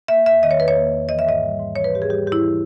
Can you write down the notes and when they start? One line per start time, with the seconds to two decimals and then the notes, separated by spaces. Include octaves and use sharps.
0.08 A#3 E5
0.26 E2 E5
0.42 D#3 D#5
0.51 C#5
0.59 E2 B4
0.68 C#5
0.76 A#3
0.93 E2
1.09 E3 D#5
1.19 E5
1.26 G#2 D#5
1.43 G3
1.59 G#2
1.76 E3 C#5
1.84 B4
1.93 G#2 G4
2.02 G#4
2.09 G3 G4
2.26 G#2 G4
2.32 E4
2.43 E3